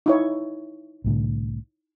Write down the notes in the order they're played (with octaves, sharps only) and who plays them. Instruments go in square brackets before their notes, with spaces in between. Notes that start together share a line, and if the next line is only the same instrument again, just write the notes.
[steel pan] D#4 E4 C#5
[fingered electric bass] C2 A2 D3